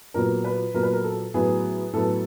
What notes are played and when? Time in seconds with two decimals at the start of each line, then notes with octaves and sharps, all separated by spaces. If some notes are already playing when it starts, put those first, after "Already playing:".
0.14 A#2 F#3 B3 A#4
0.44 B4
0.74 A#2 F#3 B3 A#4
0.83 B4
0.93 A#4
1.04 A4
1.34 A2 F#3 B3 G#4
1.93 A2 F#3 B3 A4